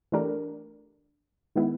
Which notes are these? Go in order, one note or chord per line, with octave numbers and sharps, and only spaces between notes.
E3 A3 D4 G4 A#4
D#3 G#3 B3 E4